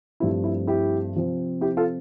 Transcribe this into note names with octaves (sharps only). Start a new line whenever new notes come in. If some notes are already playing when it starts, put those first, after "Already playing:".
G2 F3 A3 C4 E4
E4
E4 G4
C3 F3 C4
E4 G4
F4 A4